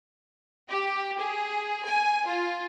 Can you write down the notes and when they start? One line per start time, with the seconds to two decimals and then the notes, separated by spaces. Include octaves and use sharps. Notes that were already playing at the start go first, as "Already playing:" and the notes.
0.69 G4
1.20 G#4
1.85 G#5
2.26 F4